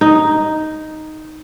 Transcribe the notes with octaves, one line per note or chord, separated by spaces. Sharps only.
D#4